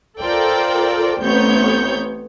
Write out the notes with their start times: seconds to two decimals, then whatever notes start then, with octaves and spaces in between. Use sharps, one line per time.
0.19 F4 A4 A#4 C5 D5 G5
1.21 A1 B3 C4 C#5 G6